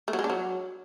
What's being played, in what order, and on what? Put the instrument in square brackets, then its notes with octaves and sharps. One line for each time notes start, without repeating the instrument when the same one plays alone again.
[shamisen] A3
F#3
G#3
D4
F#3